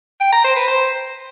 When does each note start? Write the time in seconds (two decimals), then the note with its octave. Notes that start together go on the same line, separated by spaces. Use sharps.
0.21 G5
0.32 A#5
0.44 C5
0.56 B4
0.68 C5